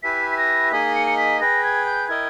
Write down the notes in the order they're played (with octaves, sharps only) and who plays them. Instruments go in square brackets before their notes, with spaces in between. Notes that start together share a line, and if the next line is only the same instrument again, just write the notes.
[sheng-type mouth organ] E4 G4 B4 E5 G#5 [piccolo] B6
[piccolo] B6
A#6
[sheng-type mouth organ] A#3 D#4 G#4 D#5 G#5 [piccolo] B6
[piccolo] C#7
C#7
B6
[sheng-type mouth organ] G#4 B4 G5 [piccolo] A#6
[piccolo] G#6
G6
[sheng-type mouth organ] E4 A#4 D#5 G5 [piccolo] G#6